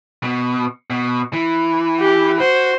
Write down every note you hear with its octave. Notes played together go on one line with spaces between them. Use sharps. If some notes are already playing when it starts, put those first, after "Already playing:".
B2
B2
E3
G4
F#4 C5